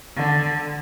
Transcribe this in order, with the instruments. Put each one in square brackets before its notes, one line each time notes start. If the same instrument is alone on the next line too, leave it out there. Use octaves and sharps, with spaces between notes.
[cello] D3